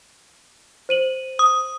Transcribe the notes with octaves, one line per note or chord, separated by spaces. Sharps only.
C5 D#7 F#7
D#6